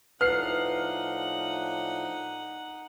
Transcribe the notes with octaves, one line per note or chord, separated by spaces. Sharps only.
A2 F3 D4 D#4 B4 F#5 F6 C7